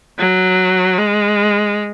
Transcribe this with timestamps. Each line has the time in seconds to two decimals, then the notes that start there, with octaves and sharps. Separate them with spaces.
0.19 F#3
0.97 G#3